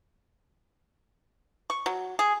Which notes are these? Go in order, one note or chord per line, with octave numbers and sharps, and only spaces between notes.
C#6
F#3
G#4